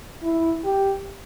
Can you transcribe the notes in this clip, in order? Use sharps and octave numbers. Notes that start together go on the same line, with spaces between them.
E4
G4